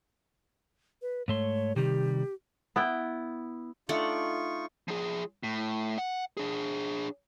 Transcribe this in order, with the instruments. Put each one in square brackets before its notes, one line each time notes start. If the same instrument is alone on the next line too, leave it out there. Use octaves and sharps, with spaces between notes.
[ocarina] B4
[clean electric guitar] G#2 A3 C6 [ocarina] C#5
[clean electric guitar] C3 D#3 G3 [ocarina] G4
[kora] B3 E4 G5
[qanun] A3 D4 F#5 [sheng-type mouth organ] D#4 F4 C#6
[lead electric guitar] F3 G#4
A2
F#5
D4 G#4